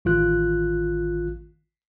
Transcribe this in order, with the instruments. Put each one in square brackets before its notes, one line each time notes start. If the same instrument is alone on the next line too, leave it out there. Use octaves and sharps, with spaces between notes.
[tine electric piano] A1 D#3 F4 F#6